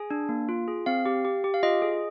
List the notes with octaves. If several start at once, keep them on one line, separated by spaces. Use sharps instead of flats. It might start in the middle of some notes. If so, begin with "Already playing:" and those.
Already playing: G#4 G#5
D4
A#3
F4
G#4
C4 F5
G4
G4
G4
F5
F4 D#5
G#4